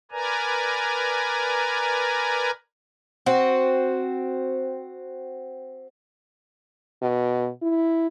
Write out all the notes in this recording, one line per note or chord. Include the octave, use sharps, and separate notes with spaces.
A#4 B4 D5 G#5 A#5
C4 F#4
B2
E4